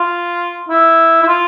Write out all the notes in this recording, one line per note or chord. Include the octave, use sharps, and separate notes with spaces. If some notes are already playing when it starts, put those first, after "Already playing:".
Already playing: F4
E4
E4
F4